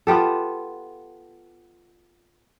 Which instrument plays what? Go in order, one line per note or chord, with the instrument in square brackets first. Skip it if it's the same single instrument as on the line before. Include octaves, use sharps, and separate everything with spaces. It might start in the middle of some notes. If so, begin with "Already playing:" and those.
[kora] B3 F4 G4 A4